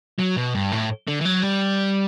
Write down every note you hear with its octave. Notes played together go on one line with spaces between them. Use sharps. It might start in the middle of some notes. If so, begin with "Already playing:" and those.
F#3
B2
G2
A2
D3
E3
F#3
G3